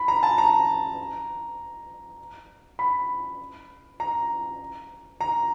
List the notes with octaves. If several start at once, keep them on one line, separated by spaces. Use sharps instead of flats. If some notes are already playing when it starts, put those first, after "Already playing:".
Already playing: B5
A#5
A5
A#5
B5
A#5
A#5